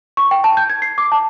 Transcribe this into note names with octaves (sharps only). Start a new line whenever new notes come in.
C#6
G5
A5
G6
G#6
C7
D6
A5